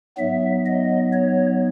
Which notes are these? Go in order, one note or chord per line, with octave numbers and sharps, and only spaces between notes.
G#2 F#3 B3 E5
D#5
C#5